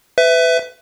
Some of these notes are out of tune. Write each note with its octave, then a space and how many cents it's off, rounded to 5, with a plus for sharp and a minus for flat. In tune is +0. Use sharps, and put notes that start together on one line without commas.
B4 +30 E5 +0